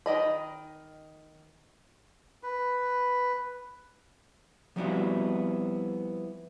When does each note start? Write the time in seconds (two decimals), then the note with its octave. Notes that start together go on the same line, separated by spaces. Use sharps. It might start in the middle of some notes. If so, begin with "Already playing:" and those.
0.06 D#3 D#5 B5
2.43 B4
4.76 F3 G3 B3 C4 E4 F#4